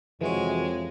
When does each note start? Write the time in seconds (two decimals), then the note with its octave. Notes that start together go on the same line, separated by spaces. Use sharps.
0.21 F2 C3 E3 G#3 E4 F#4 G#4 C#5